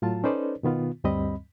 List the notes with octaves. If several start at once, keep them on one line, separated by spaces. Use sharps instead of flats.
A2 F#3 F4 A5
C#4 D#4 A4 B4 C5 D5
B2 D#3 B3 F4
D2 G2 G3 C4 D#5 B5